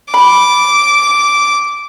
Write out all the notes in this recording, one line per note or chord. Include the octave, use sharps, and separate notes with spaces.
B5 D6